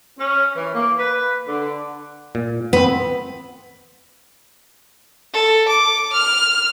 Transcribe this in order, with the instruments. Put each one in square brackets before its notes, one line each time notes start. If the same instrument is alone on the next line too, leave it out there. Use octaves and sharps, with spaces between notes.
[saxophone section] C#4
E3
A#3
B4
D3
[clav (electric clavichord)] A#2
[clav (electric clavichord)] B3 C4 [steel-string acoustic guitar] B4
[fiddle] A4
D6
F6